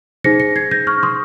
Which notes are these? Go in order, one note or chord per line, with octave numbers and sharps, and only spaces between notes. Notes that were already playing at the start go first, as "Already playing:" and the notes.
D#4 G#4 C5 A#6 C#7
A#6 C#7
G#6 C7
G6 A#6
C#6 F6
C6 D#6